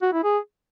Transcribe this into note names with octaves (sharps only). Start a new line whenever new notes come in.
F#4
E4
G#4